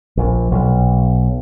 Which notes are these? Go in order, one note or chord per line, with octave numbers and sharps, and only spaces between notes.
A#1
B1